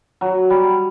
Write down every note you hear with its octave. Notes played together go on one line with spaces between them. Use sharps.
F#3
G3